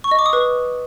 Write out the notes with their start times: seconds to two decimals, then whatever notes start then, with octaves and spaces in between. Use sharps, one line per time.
0.04 C#6
0.11 D#5
0.19 D6
0.26 D#6
0.33 B4